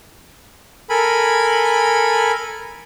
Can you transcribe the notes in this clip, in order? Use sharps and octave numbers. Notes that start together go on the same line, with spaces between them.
A4 A#4 G#5 B5